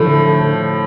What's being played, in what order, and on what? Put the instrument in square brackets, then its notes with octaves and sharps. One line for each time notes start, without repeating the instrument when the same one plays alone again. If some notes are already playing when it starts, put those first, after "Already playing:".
Already playing: [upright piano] A2 F3 [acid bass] D3